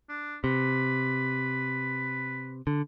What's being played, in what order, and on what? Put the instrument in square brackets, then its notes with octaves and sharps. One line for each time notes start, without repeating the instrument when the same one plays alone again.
[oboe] D4
[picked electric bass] C3 [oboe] B4
[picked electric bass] D3